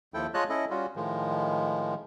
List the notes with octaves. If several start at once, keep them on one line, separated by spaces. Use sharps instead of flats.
D#2 F3 E4 A4 G5
G#3 F4 C#5 D#5 A5 F#6
C#4 E4 A4 D#5
G3 C#4 F4 F#4
A2 D#3 F3 G#3